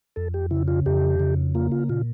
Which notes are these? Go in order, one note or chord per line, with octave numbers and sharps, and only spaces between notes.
F2 A4
G4
C#3 E4
F4
F2 G4
C#3
A#3 F4
F4
A#2 F4